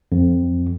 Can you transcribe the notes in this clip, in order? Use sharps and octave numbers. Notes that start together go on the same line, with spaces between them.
F2